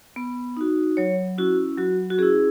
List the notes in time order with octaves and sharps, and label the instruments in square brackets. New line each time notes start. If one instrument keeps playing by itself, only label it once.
[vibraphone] B3
D#4 F#4
F#3 C#5
C#4 E4 F#4
F#3 F#4
F#4
C#4 E4 G#4